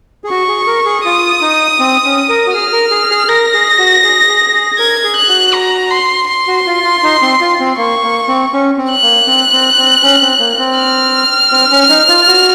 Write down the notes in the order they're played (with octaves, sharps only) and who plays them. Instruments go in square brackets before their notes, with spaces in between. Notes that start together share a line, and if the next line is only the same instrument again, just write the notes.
[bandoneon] G#4
[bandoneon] F#4 [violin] C#6
[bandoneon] G#4
A#4
G#4
[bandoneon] F4 [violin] D#6
[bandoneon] D#4
C4
C#4
A#4
F#4
[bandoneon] G#4 [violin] F6
[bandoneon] A#4
G#4
G#4
[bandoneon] A#4 [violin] A#6
[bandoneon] G#4
F#4
G#4
G#4
G#4
[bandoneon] A#4 [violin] G#6
[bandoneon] G#4
[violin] F#6
[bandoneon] F#4
[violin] A#5
C6
C6
[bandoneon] F#4
F4
F4
D#4
C4
F4
C4
[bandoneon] A#3 [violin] C#6
[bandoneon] A#3
C4
C#4
C4
[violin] F#6
[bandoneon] A#3
C4
C4
C4
C#4
C4
A#3
C4
[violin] F6
[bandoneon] C4
C#4
D#4
F4
F#4